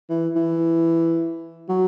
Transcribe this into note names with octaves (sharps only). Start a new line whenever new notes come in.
E3
E3
F#3